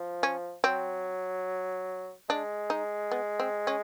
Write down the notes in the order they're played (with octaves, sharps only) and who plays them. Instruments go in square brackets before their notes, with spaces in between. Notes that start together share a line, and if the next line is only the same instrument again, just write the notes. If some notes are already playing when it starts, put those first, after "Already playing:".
Already playing: [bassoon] F3
[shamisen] C#4
[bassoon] F#3 [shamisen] C4
[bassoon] G#3 [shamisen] D4
[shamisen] D#4
B3
C4
C#4